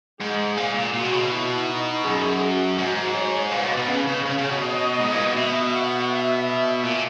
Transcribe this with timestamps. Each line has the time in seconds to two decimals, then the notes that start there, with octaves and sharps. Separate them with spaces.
0.20 G#2 G#4
0.57 A#2
0.75 A#2
0.94 A#2 F#4
1.03 B2
1.12 C#3
1.21 B2
1.31 E4
1.67 D#4
2.04 F#2 G#4
2.42 F#4
2.78 G#2
3.14 C#5
3.51 A#2 B4
3.64 B2
3.77 B2
3.88 C#3
4.07 C#3
4.25 C#3 C#5
4.38 C#3
4.50 B2
4.62 D#5
5.00 G#2
5.12 A#2
5.25 B2
5.37 B2 E5
5.74 F#5
6.09 E5
6.47 E5
6.83 A#2